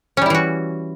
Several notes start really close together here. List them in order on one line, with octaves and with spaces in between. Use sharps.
C#4 G3 E4 E3 F#4